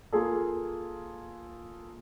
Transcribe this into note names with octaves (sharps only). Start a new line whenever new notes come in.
A#3 F4 G#4 A4